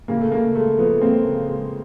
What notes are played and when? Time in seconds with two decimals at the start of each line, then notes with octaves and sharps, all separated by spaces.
0.08 C#3 A#3
0.21 A3
0.32 C#3 A#3
0.55 G#3 A3
0.78 F3 A3 B3
1.01 G#3 A#3 C4
1.25 C#3
1.48 G#3